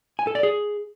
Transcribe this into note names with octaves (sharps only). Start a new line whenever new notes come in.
G#5
A4
D5
G#4